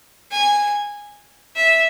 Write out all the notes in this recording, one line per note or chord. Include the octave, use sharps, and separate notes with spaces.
G#5
E5